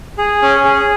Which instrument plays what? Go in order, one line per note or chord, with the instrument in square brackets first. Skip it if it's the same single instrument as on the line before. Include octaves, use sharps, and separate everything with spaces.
[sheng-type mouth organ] G#4
C#4
G#4